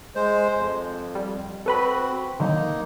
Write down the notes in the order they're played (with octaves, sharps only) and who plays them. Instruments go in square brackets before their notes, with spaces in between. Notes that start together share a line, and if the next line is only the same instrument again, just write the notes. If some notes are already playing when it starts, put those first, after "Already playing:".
[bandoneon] G#3 C5
F2
[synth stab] G3
[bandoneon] C4 F#4 [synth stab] A4 B4 B5
[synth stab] D3 D#3 F#3 [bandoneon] A#3 D#4